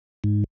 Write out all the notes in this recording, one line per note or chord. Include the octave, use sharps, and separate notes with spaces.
G#2